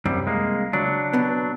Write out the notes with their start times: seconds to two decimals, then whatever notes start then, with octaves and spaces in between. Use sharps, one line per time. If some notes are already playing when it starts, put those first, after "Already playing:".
0.05 C2 F#2 G3 C4
0.27 G#3 A#3
0.73 C#2 F#3 D4
1.13 B2 B3